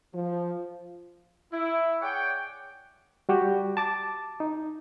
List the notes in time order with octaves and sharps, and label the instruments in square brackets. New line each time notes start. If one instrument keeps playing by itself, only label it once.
[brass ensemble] F3
[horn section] E4
G#4 C#5 D5 F#5 G5
[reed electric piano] G3 F#4 G4
A5 D6 A6
D#4